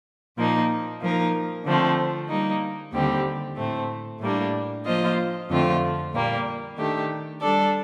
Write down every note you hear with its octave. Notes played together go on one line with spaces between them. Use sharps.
A#2 F3 A#3 D#4
F3 A#3 D#4 A#4
D3 F3 A3 C4
G3 A#3 D#4
D#2 D3 G3 C4 G4
A2 A3 C4
A2 G3 A#3 D4
F3 A#3 F4 C5 D#5
F2 D3 A3 C4 F4
A#2 G3 A#3
D#3 A3 D4 G4
G3 D4 A4 D5